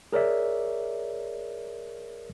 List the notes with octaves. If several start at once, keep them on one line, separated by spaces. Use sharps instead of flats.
G#4 A#4 C#5 D5 E5